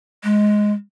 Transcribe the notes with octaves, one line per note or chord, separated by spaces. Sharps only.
G#3